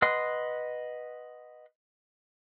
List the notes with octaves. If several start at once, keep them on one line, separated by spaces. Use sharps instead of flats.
B4 D#5 F#5 C6